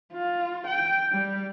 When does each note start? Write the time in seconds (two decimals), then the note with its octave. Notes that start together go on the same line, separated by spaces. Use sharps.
0.12 F4
0.67 G5
1.12 G3